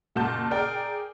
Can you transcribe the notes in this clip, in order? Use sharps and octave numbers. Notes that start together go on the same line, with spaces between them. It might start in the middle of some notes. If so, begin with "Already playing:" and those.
F#1 A#2 F#4 F#5 A5 G6
G#4 A#4 D5 G5 G#5